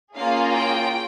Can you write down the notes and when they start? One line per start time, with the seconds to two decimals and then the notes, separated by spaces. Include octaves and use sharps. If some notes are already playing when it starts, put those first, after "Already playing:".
0.15 A#3 C#4 F4 G#4 F5
0.50 G5